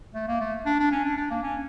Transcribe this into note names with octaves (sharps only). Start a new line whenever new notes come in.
A3
A#3
A3
D4
D4
C#4
D4
D4
A#3
C#4